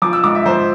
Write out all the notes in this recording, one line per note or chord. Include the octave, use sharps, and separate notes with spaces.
F3 D6
E6
G#2 D6
E5
F3 C5